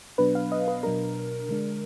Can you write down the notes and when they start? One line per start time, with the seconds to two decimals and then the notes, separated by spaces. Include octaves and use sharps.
0.18 B2 F#3 B3 D4 B4
0.35 F5
0.52 D#5
0.68 B4
0.83 B2 F#3 D4 A#4
1.49 D3 G#3 D4